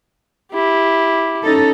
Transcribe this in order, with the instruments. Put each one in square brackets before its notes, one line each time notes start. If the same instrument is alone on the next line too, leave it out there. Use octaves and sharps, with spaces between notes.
[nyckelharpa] E4 G4
[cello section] C#4 D#4 A4